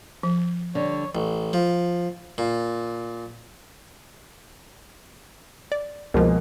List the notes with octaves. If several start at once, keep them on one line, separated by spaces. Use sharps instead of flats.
F3
D3 G3 C#5
A1
F3
A#2
D5
C#2 B2 F3 G#3 A#3